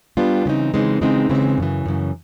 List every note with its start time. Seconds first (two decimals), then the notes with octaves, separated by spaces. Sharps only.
0.17 G3 B3 D4 F4
0.46 C#3 E3 G#3 C4 D#4
0.74 C#3 E3 G#3 C4 D#4
1.01 C#3 E3 G#3 C4 D#4
1.30 C#3 E3 G#3 C4 D#4
1.58 F#2 C#3 E3
1.86 F#2 C#3 E3